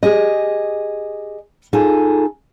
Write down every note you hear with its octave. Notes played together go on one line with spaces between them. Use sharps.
G4 G#4 D#5
D#4 F4 G#4 A4